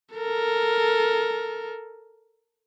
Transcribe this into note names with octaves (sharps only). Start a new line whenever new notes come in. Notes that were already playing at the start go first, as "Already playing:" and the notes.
A4 A#4